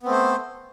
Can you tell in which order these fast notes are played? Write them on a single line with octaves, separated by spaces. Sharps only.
B3 C4 A3 C5